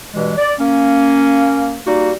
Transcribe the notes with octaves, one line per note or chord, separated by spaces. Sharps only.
G2 B2 E3 G#3
D5
A#3 C#4
G3 A#3 D#4 F#4